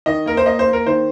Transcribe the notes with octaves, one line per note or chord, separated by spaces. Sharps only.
D#3 D#5
A#3 A#4
C5
A#3 D#5
C5
A#3
A#4
D#3 C5